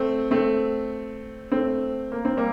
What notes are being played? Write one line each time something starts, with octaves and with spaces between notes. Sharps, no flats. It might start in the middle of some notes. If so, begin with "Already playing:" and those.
Already playing: A3 C4
A3 C4
A3 C4
A#3
C4
G3 A#3